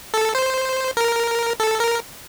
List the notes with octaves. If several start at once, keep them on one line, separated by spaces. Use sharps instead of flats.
A4
C5
A#4
A4
A#4